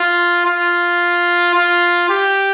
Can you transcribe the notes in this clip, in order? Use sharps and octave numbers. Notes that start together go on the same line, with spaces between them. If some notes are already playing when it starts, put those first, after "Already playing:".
Already playing: F4
F4
F4
G4